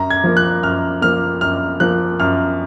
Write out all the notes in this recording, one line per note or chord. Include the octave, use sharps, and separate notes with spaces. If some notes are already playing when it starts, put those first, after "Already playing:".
Already playing: F#2 A#5
G#6
F3 A#3
F#6
F#2 F6
F3 A#3 F6
F#2 F6
F3 A#3 F#6
F#2 F6